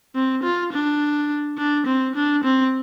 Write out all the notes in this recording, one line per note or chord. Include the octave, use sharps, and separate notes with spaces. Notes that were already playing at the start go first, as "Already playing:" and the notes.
C4
F4
D4
D4
C4
D4
C4